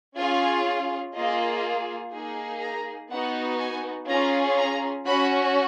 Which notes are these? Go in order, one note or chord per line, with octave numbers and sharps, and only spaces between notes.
C#4 F4 G#4 G#5
A#3 F4 G#4 D#5
A#3 D#4 G#4
A#5
B3 D#4 F#4 F#5
G#5
C#4 F4 G#4 A#5
A#5
C#4 F#4 B5